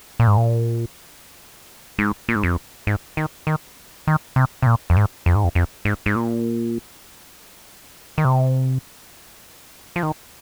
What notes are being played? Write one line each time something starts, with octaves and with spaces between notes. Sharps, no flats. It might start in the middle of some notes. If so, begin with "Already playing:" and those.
A#2
G#2
A#2
G#2
A#2
G#2
F2
G#2
D#3
D#3
D#3
C3
C3
A#2
F2
G#2
F2
G#2
F2
F2
G#2
G#2
A#2
D#3
C3
F3
D#3